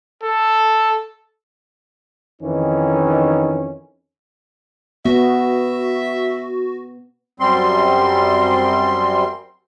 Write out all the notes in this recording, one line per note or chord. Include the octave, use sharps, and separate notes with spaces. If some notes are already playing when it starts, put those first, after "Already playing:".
A4
F2 D#3 E3 C#4 D#4
B3 F#4 E5
F#2 G3 C4 C6